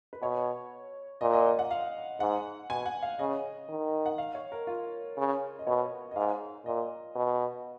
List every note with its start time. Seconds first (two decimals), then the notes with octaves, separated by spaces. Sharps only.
0.13 B4
0.22 B2 C#5
1.21 A#2 D#5
1.33 D#5
1.46 D#5
1.59 F#5
1.71 F5
2.20 G#2 F#5
2.70 B2 G#5
2.86 F#5
3.03 F5
3.19 C#3 D#5
3.68 D#3
4.06 F#5
4.18 F5
4.35 C#5
4.52 A#4
4.67 F4
5.18 C#3
5.59 D#5
5.67 B2 C#5
6.11 D#5
6.16 G#2 F5
6.66 A#2 D#5
7.15 B2